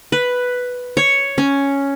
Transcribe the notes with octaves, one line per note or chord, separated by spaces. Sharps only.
B4
C#5
C#4